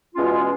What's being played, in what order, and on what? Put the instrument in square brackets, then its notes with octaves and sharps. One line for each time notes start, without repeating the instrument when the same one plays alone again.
[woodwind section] E2 B2 G#3 C#4 F4